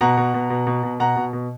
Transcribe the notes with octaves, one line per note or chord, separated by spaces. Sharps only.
B2 F#5 A#5
B2
B2
B2
B2
B2
B2 F#5 A#5
B2
B2